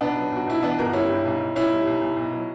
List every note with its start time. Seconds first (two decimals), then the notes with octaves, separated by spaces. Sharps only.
0.01 B1 B3 D4
0.16 F#3
0.32 B1 F#4
0.47 B1 E4
0.63 E3 B3 D4
0.78 G1 F#4 A#4
0.93 G3 C#4 E4
1.09 G2
1.25 B1
1.40 B1
1.55 B1 C#4 E4
1.72 G3
1.87 B1
2.01 B1
2.17 B1
2.33 F#3